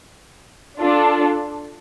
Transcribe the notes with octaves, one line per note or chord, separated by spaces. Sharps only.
D4 F4 A4